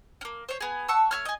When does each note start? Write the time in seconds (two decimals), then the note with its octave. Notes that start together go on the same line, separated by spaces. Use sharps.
0.21 A#3 C#4
0.49 C5 C#5
0.60 B3 G#4
0.88 F#5 A5 C#6 E6
1.11 A3 C#5 F6
1.25 G#4 D#5